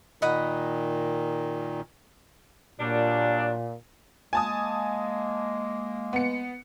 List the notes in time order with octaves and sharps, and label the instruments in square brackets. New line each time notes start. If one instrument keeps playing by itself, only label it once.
[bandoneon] A#2 D#3 [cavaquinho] D#5 F#5 B5
[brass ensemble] A#2 [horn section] F#3 G3 D4
[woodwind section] G#3 A#3 [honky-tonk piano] G#5 A5 D#6
[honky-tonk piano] B3 C#7